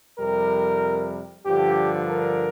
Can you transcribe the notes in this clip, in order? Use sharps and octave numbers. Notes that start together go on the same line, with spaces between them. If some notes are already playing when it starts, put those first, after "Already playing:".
F2 C3 G3 A#4
G2 D3 F3 G4
A#4